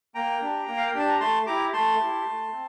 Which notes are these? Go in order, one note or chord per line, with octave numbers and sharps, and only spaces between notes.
A#3 G5 A#5
D4 G4
A#3
F5
G5
D4 G4 A5
A#5
A3 A5 C6
E4 G4 A#5 D6
A3 A5 C6
E4 G4
A3
C4